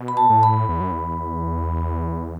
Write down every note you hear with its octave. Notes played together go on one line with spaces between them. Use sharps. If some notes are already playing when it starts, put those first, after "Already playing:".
Already playing: B2
B5
A5
A2
B5
E2
F#2
E2